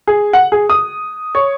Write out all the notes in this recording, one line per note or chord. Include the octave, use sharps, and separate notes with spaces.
G#4
F#5
G#4
D#6
C#5